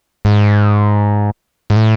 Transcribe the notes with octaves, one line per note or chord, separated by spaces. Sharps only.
G#2
G#2
A2